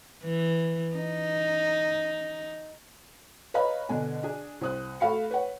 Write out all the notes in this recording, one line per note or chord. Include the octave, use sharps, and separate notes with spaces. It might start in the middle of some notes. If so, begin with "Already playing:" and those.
E3
D#4
B4 C#5 D#5 F5 A#5 B5
B2 D3 D4 G#5
D4 G#4
C2 C5 D#6 F#6
A3 F#4 F5 B5 C#7
B4 C#5 F#5